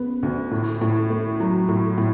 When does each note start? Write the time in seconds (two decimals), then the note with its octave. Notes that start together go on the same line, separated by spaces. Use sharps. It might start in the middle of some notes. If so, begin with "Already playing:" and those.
Already playing: C#3 B3
0.23 D2
0.51 A2
0.81 A2
1.10 A3
1.40 F#3
1.69 A2
1.98 A2